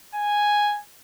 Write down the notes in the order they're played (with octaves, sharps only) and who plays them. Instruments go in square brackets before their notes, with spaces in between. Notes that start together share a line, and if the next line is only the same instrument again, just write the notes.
[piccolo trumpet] G#5